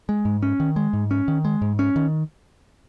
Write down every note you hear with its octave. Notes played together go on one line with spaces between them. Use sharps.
G#3
G#2
C#4
D#3
G#3
G#2
C#4
D#3
G#3
G#2
C#4
D#3